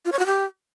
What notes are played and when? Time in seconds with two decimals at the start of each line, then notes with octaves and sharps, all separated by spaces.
0.05 F4
0.12 C#5
0.19 F#4
0.26 G4